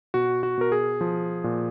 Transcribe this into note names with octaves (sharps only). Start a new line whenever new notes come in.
B2 F#4
F#4
B2 A#4
G#4
F3
A#2